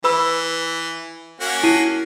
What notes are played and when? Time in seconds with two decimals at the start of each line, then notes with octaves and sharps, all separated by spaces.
0.04 E3 B4 B5 E6
1.40 A#3 C#4 F#4
1.63 E4 C7 D#7